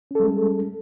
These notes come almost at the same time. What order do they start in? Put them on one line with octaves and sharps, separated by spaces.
C#4 A4 G3 G#3